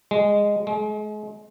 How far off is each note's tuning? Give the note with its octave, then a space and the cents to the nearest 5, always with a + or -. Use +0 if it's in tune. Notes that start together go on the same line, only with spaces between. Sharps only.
G#3 -10
G#3 +35